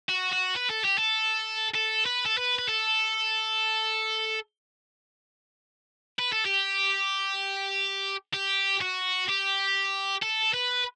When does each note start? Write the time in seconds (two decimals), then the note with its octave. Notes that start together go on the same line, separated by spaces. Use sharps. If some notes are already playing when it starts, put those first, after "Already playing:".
0.09 F#4
0.33 F#4
0.56 B4
0.70 A4
0.84 G4
0.98 A4
1.74 A4
2.06 B4
2.26 A4
2.38 B4
2.59 B4
2.68 A4
6.19 B4
6.32 A4
6.45 G4
8.34 G4
8.81 F#4
9.29 G4
10.23 A4
10.54 B4